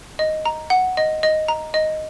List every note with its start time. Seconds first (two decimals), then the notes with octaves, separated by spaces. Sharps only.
0.19 D#5
0.45 A#5
0.70 F#5
0.97 D#5
1.23 D#5
1.48 A#5
1.74 D#5